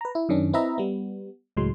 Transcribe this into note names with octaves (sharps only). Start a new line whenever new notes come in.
B4 A#5
E4
F#2 D#3 C#4 D4
C4 E4 B4 D#5 E5 A#5
G3 B3
C#2 A2 F#3 G#3 C6